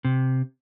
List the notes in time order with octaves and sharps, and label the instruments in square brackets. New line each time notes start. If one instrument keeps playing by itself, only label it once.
[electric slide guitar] C3